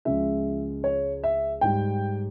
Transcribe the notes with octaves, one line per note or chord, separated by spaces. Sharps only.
C#2 C#3 F3 G#3 E5
C#5
E5
G#2 G3 G5